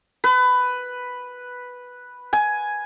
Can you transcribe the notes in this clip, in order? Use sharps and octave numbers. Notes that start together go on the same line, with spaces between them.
B4
G#5